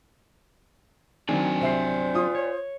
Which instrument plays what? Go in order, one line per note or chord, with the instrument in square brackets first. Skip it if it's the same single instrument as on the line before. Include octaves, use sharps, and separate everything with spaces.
[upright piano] D#3 [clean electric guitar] F#3 C4 D4 [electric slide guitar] D5 G5 G#5
[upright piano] C2 E5 C7 [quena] C5
[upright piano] F4 D#6
[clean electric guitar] C#5